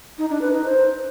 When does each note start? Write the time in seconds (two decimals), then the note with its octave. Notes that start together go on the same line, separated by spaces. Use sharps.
0.18 D#4
0.29 D4
0.41 B4
0.52 D#4
0.64 C5